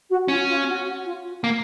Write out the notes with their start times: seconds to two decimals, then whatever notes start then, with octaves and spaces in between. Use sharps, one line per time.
0.09 F#4
0.28 C#4 F4
0.48 F4
0.68 F#4
0.86 F#4
1.05 F4
1.44 A#3